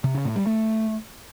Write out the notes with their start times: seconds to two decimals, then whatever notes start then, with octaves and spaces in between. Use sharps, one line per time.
0.04 C3
0.15 C#3
0.25 A2
0.36 G3
0.46 A3